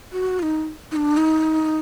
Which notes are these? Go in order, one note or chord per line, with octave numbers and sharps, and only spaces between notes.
F#4
F4
D#4
D#4
D4
D#4